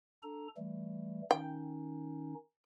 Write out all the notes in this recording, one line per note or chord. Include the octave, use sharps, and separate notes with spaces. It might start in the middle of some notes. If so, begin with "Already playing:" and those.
D4 A4 A#5
E3 G3 A3
D#3 C#4 D#4 G5